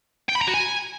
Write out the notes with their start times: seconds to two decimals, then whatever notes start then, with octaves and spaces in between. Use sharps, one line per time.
0.29 G5
0.35 B5
0.41 A#5
0.48 F#4
0.54 G#5